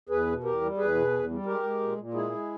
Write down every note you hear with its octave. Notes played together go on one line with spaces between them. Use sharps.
E2 G#4 B4
B2
E2 G4 A#4
G3
E2 G#4 B4
B2
E2
G3
G#3 G4 A#4
G#3
A#2
A#2
G#3 E4 G#4
G#3